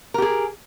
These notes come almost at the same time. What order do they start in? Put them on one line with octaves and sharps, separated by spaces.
A#4 G4 G#4